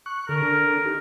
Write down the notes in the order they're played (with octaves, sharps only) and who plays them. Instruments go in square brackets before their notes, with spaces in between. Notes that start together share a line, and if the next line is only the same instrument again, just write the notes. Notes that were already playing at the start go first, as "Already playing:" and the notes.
[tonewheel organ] C#6 F#6
[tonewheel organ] D3 A4 [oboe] A#4
[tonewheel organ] D4 A4
D#4 G4